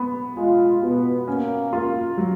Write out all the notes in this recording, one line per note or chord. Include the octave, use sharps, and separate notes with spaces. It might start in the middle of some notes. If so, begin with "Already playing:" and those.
Already playing: B3
G#3 F4
B2 B3
A#3 C#4
F4
F#3